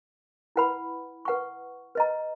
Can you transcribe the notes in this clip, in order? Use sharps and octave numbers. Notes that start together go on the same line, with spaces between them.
E4 B4 F#5 B5
B4 F#5 C#6
B4 D#5 A#5